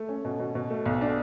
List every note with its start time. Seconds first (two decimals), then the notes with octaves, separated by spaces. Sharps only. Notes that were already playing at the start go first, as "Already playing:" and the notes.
Already playing: A3
0.09 C#4
0.25 B2
0.39 B2
0.55 B2
0.70 A3
0.86 B1
1.01 D4